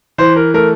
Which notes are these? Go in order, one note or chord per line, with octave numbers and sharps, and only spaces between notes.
E3 C5
A#4
A3 A#4